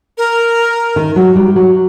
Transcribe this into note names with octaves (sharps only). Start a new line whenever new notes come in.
A#4
D#3
F#3
G3
F#3